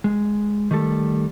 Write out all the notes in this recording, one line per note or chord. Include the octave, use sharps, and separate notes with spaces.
G#3
D#3 G3 A3 A4